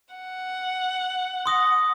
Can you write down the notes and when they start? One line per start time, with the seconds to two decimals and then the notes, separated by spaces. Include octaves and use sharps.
0.15 F#5
1.46 C6 D#6 A#6